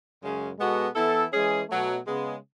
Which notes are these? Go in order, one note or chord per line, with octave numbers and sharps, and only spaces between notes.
F#2 C#3 G#3 C#4
B2 G#3 B3 F#4 A4
E3 B3 E4 A4
E3 G#3 C#4 G#4
B2 F#3 A3
C#3 G#3 B3